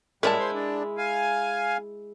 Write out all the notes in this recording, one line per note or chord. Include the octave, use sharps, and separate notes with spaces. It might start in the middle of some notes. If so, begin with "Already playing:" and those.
A2 G3 G#3 E4 A#4 D5 A5
C5 C6
D4
F5 G#5